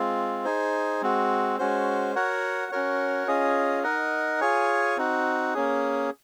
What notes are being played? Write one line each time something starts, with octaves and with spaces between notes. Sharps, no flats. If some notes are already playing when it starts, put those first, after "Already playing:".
Already playing: G#3 C4 F4
D#4 G#4 C5
G#3 C4 F#4
G#3 C#4 F#4 C5
F#4 A#4 C#5 F#5
C#4 F#4 A#4 C#5
C#4 F4 G#4 D#5
D#4 A#4 D#5 F#5
F4 G#4 C#5 G#5
C4 D#4 F#4
A#3 C#4 G#4